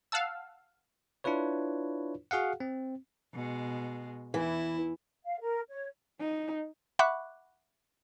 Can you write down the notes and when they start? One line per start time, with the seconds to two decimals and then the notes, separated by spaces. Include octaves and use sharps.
0.12 F5 F#5 A5 E6
1.24 D4 E4 F4 B4 C#5
2.31 F#4 G#4 F5 F#5
2.60 C4
3.32 B2 G#3
4.34 E2 E3 E4
5.24 F5
5.40 A#4
5.69 C#5
6.20 D#4
6.99 E5 F#5 B5 C#6 D6 F#6